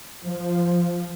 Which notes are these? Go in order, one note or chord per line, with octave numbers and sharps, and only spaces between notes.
F3